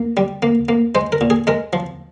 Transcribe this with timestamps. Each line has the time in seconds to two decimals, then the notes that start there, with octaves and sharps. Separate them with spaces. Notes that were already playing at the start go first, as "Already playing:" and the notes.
Already playing: A#3
0.17 G3
0.43 A#3
0.69 A#3
0.95 G#3 C5
1.12 A#4
1.21 A#2
1.30 G#4
1.47 G#3 A#4
1.73 F3